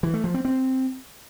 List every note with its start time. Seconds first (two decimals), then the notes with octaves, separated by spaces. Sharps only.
0.03 E3
0.14 A3
0.24 F3
0.34 C4
0.45 C4